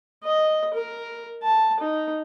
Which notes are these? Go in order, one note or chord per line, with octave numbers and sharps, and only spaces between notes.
D#5
A#4
A5
D#4